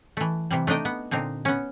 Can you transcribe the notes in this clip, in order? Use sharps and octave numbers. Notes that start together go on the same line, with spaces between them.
E3 A3
C3 E3 G3
A3 D4 D#4 D#5 G5
B3
A#2 D3 C4 D#4
B3 C#4